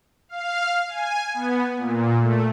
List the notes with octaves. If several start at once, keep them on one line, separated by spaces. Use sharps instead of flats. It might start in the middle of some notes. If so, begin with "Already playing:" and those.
F5
G#5
B3
A#2
A3